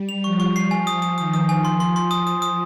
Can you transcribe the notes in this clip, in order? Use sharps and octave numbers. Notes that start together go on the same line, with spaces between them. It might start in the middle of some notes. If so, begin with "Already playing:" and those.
Already playing: G3
F7
F3 C#6
C#6
C7
F3 G#5
D#6
D#6
D#3 D#6
D#6
G#5
F3 C6
C6
C6
F3 D#6
D#6
D#6